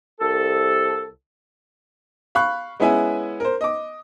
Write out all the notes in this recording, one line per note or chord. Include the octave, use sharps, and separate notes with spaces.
C2 A4
F5 B5 C#6 F#6
G#3 B3 C#4 E4 E5 G#5
A#4 C5
D#5 D6